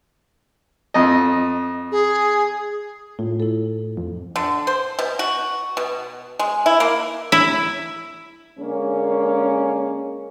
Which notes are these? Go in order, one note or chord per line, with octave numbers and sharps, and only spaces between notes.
F2 D#5
G#4
A2 F4
E4 A4
F2
D3
C5
B2
F#4
B2
G#3
E4
A#3
E4
D3 G#3 A#3 C#4